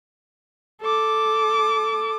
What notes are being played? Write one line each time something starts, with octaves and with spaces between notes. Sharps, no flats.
A4 D6